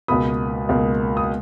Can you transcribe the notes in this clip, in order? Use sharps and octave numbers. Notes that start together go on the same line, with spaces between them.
C#2 B2 A#3 B5 D#6
C#2 B2 A#3
D#6